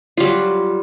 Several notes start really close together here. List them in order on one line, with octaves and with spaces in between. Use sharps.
F4 G3 F#3